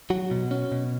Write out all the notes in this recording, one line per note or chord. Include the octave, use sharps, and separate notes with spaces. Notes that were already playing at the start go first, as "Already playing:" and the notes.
F#3 F#4
B2
C#4
B2